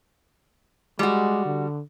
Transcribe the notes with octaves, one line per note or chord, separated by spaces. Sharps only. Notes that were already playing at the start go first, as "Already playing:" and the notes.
G3 G#3 F#4
D3